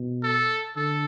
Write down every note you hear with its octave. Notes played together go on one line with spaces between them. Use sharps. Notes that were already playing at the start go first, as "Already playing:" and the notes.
Already playing: B2
A4
D3 A4